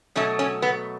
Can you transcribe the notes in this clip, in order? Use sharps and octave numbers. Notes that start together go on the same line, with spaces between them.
B2 F#3 A3 C#4
C#4
B3